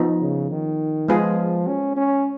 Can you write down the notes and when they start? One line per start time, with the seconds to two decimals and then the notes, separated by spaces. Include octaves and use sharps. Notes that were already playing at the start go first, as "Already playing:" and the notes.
Already playing: F3 B3 D#4
0.21 C#3
0.51 D#3
1.09 F3 G#3 B3 F4 G#4 B4
1.68 C#4
1.97 C#4